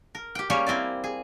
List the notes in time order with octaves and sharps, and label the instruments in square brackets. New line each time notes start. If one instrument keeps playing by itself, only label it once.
[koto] A#4
G4 G5
G3 A#3 C#4 G4 G#4 C#5
A#3 C4 E4 D5
G#4